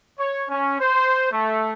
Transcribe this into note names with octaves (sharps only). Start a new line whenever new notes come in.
C#5
C#4
C5
A3